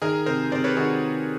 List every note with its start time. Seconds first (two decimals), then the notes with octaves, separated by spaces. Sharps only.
0.02 D#3 G#4 A#4
0.26 C3 A#4 C5
0.52 C3 C5 D5
0.64 B4 C#5
0.77 D#3 F#4 G#4